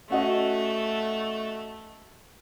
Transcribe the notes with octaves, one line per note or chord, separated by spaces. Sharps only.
A3 C#4 F#4 D#5